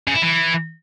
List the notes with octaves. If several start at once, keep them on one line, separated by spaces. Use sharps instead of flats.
C#3
E4
E3